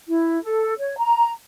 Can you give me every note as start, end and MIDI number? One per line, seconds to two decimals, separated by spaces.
0.07 0.42 64
0.43 0.75 69
0.79 0.95 73
0.98 1.29 82